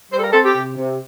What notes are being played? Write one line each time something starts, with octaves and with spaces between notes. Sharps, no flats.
G3 C5
A4
A#4
C4 A4
G4
C3
C3